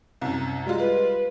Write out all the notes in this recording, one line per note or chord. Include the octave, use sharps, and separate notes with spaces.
C2 F#2
G3 G#3 F4
B4